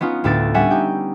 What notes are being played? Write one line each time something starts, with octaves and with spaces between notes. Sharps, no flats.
B3 C#4 D#4 F4
D2 A2 B3 A4 A6 D7
G3 C#4 E5 F#5 G#5
D#4 G4 G5